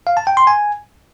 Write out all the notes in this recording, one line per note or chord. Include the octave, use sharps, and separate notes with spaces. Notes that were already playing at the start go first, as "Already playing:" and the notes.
F5
A5
G5
C6
G#5